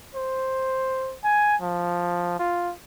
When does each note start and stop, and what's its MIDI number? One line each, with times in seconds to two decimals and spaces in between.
0.15 1.15 72
1.24 1.56 80
1.62 2.37 53
2.39 2.72 65